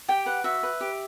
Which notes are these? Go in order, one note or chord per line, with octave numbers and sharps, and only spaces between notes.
G4 G5
B4 F#5
F#4 E5
B4
G4